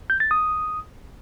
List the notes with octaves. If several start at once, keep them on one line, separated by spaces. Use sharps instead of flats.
G6
A6
D#6